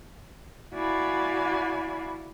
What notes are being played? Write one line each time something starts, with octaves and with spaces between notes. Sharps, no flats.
E4 F#4 D5 F5 G#5 B5